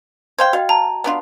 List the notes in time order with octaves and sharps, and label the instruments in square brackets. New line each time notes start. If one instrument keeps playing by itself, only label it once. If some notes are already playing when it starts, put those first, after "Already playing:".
[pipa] C5 F5 G5 [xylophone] G#6
[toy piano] F#4 D#5 G5 [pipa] F5
[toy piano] A5 [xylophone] A#5
[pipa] B3 D4 F4